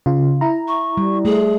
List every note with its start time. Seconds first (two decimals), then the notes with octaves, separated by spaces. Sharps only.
0.06 C#3 F4
0.41 E4 A#5
0.68 C#6
0.97 G3
1.25 A3 G#4